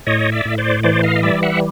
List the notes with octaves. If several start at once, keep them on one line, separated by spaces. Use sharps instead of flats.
A2 C#5 D#5
D5 E5
A2
C5 D5
E3 C5 D5
D#5 F5
D#5
G3 D5 E5
E5 F#5